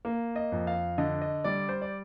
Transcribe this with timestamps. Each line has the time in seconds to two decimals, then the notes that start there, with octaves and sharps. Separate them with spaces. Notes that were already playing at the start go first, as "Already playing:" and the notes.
0.05 A#3
0.36 D#5
0.52 F2
0.67 F5
0.98 D3 D#5
1.22 D#5
1.44 G3 D5
1.69 C5
1.82 D5